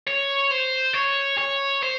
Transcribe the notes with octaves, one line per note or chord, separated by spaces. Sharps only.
C#5
C5
C#5
C#5
C5